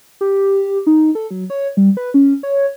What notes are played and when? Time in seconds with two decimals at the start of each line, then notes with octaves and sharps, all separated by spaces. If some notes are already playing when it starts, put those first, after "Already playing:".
0.21 G4
0.87 D#4
1.15 A4
1.31 F#3
1.50 C#5
1.77 G3
1.97 B4
2.14 C#4
2.43 C#5